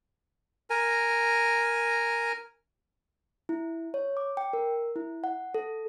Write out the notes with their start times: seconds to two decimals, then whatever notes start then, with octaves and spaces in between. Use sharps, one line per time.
0.70 A#4 G#5
3.49 E4
3.94 C#5
4.17 D6
4.37 G5
4.53 A#4
4.96 E4
5.24 F#5
5.54 A4